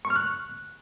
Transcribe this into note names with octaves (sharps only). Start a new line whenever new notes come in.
C#6
F6
F#6